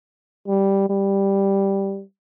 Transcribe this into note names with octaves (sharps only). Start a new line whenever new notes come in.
G3
G3